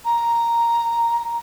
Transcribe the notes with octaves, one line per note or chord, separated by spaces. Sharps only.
A#5